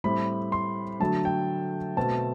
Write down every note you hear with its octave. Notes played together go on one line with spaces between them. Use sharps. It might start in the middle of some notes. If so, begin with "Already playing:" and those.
A2 G3 C4 B5
C6
D3 F#3 A3 A5
G5
B2 A3 C4 A5